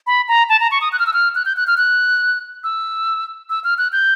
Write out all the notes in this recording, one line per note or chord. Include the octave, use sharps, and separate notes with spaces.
B5
A#5
A5
A#5
C#6
D#6
F#6
F6
E6
F6
F#6
G6
F#6
F6
F#6
E6
E6
F6
F#6
G6